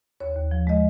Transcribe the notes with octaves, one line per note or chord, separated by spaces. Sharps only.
D#2 C#5
D#2
F3
G#3 D#5